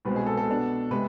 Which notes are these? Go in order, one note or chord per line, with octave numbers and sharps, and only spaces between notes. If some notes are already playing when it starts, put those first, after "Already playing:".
C2 B2 G#3 C4 B4
G#4
A4
A4
B2 B3 D4
C3 G#3 B4